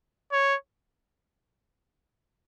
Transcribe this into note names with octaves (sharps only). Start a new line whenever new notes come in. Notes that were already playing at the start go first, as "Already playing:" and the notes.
C#5